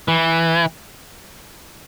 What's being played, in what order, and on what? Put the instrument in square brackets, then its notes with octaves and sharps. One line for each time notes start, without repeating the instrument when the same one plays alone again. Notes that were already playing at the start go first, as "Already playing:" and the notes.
[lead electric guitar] E3